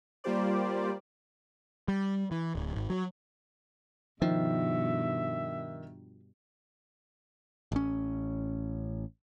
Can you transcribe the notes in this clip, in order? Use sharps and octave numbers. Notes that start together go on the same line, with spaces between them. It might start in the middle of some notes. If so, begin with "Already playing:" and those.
G3 A#3 F4 G4 C5 D5
G3
E3
D1
G#1
F#3
G2 B2 D#3 F3 E5
A1 C#4